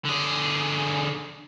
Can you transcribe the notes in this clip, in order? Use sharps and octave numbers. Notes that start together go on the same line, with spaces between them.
D3 G#4